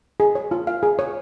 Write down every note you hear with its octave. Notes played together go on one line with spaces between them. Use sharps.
G#4
C#5
F4
F5
G#4
C#5